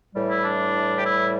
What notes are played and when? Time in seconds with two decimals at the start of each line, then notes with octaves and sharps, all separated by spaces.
0.15 A2 E3 G3
0.30 E4
0.45 D4
0.99 G4
1.05 E4